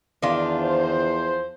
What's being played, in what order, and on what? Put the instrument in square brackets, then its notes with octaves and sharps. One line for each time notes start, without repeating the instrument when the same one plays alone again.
[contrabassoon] E2 [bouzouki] D#3 D4 F4
[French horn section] F3 C5